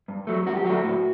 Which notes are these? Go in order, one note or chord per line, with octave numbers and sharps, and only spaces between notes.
G2
F#3 A3
G2 F#4
G4
F#3 A3 F#4
A2